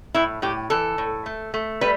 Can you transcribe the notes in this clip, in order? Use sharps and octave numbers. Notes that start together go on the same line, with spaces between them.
A2 E4
A2 G4
E3 A4
A2
A3
A3
G3 B4